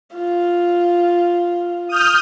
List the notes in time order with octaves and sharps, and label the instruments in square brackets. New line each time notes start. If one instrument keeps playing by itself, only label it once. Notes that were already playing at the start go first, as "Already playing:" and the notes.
[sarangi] F4
[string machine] D#6 F6 G6